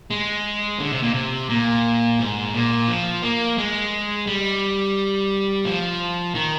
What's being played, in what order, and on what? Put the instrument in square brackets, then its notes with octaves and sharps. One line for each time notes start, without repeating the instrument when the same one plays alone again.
[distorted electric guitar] G#3
D3
C3
A#2
C3
A#2
G#2
A#2
F3
A#3
G#3
G3
F3
D#3